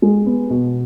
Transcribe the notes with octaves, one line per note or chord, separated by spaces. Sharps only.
G#3
B3
B2